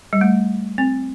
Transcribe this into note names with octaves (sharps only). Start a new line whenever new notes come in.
G3
A3
C4